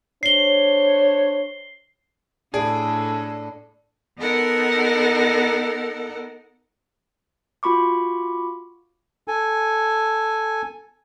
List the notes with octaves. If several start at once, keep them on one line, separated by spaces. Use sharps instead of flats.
D4 C5 C#5 C7 G7
A2 D4 G#4 A4 D5 A5 D7
B3 D#4 A4 A#4 F#5
F4 F#4 B5 C#6 D6
A4 G#5